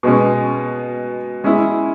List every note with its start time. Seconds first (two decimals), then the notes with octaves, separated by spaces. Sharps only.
0.03 B2 G#3 C#4
1.44 G#3 C#4 E4